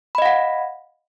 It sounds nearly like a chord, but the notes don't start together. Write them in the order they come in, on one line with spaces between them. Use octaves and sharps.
B5 D#5 F5 F#5